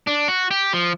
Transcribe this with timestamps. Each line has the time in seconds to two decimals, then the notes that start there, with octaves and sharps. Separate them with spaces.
0.07 D4
0.28 F#4
0.51 G4
0.73 F3